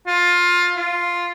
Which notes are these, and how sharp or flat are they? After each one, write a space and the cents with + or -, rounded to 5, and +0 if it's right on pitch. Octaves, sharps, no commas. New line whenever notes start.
F4 +15
F4 +0